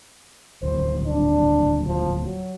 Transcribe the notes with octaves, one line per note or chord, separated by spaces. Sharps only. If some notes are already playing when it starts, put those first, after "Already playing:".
D#1 D2 C5
D4
F3
F#3